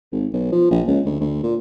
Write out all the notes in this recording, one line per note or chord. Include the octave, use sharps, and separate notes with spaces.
G#1
B1
F3
A#1
C#2
D2
D2
A#2